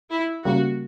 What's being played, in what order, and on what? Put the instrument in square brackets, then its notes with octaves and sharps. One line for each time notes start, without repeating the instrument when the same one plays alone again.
[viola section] E4
[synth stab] C#3 G3 A#3 [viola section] F#4